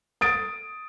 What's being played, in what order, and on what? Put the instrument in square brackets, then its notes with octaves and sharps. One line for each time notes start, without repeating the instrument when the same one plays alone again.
[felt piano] D#6 A6 D7